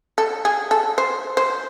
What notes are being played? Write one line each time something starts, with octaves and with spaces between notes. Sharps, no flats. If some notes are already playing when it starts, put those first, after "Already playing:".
A4
G#4
A4
C5
C5